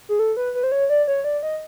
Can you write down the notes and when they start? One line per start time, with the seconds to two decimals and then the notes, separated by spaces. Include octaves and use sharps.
0.09 G#4
0.19 A4
0.37 B4
0.55 B4
0.63 C5
0.72 C#5
0.90 D5
1.08 C#5
1.24 D5
1.43 D#5